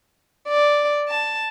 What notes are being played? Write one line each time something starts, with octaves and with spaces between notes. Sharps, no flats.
D5
A5